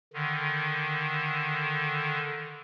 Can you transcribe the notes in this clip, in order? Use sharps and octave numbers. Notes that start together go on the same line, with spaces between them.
D3 D#3